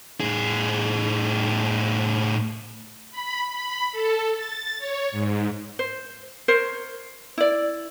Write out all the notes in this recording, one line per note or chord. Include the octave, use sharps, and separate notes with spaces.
A2 G#4
B5
B5
A4
A6
C#5
G#2
C5
A#4 C5 C#5
E4 D5